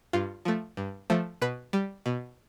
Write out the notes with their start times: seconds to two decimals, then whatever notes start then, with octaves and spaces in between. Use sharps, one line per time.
0.13 G2 F4
0.45 F3 A3
0.77 G2
1.10 F3 A3
1.41 B2 B4
1.73 G3
2.06 B2